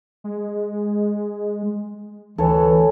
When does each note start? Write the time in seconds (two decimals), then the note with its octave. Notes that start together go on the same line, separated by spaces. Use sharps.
0.24 G#3
2.38 D2 E3 A4 C#5